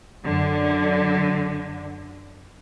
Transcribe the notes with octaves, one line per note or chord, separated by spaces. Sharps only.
F#2 D3